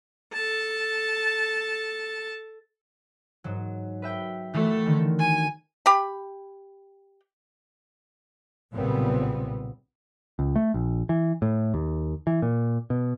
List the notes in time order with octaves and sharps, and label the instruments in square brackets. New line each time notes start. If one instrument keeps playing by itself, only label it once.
[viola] A4 A5
[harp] G#2 F#3
B4 E5 G5
[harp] E3 F#3 G4 [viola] A3
[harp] D3 D#3
[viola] G#5
[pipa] G4 B5
[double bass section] B1 A#2 C#3 G3 B3 C4
[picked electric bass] C#2
A3
A#1
E3
A2
D#2
E3
A#2
B2